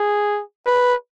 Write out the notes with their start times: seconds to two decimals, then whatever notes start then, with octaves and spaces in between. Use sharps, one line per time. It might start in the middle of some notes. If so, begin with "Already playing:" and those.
Already playing: G#4
0.66 B4